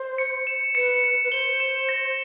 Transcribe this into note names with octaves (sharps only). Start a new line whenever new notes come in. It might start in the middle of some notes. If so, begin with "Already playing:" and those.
Already playing: C5
C#7
E7
B4 C#7
C#7
B4
C5 G7
E7
A#6